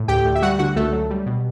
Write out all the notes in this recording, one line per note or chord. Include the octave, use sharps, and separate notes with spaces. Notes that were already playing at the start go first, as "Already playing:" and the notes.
Already playing: A2
D2 G4 G5
D2
E5
G3 F#4 F#5
D3 F#4 F#5
C#2 A3 A4
F#3
G3
B2